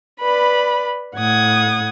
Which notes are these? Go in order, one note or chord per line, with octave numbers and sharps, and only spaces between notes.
B4 D5 B5
A2 F#5 D#6 G#6